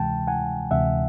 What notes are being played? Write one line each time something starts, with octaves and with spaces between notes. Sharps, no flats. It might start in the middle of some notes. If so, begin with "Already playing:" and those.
Already playing: D2 C3 E3 G#3 G5 A5
F#5 G#5
D2 C3 E3 G#3 E5 F#5